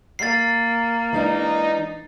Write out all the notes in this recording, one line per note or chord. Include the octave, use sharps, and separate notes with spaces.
A#3 A6 C7
E3 G#3 D4 D#4